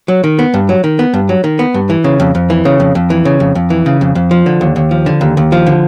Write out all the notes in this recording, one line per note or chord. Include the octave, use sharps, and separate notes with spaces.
F#3
D#3
B3
G2
F#3
D#3
B3
G2
F#3
D#3
B3
G2
E3
C#3
F2
F2
E3
C#3
F2
F2
E3
C#3
F2
F2
E3
C#3
F2
F2
F3
D3
D#2
D#2
F3
D3
D#2
D#2
F3
D3